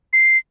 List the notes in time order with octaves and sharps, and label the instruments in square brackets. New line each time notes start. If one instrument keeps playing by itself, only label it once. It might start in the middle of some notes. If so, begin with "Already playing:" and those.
[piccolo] C7